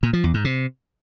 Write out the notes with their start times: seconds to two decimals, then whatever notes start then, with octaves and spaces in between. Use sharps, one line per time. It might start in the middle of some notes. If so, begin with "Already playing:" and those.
0.03 A#2
0.13 F3
0.24 E2
0.34 G#2
0.45 C3